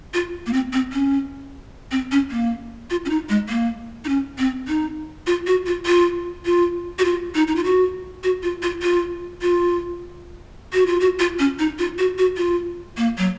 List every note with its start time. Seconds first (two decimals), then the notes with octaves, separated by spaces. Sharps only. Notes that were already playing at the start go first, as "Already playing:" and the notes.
0.14 F4
0.46 A#3
0.53 C4
0.73 C4
0.93 C#4
1.91 C4
2.12 C#4
2.31 A#3
2.90 F4
3.05 C#4
3.10 D#4
3.29 G#3
3.49 A#3
4.05 D#4
4.09 C#4
4.38 C4
4.68 D#4
5.27 F4
5.47 F#4
5.66 F4
5.86 F4
6.45 F4
6.99 F#4
7.05 F4
7.35 D#4
7.47 D#4
7.56 F4
7.64 F#4
8.23 F#4
8.43 F4
8.62 F4
8.82 F4
9.42 F4
10.73 F#4
10.87 F4
11.00 F#4
11.19 F4
11.39 C#4
11.59 D#4
11.79 F4
11.98 F#4
12.18 F#4
12.37 F4
12.97 A#3
13.18 F#3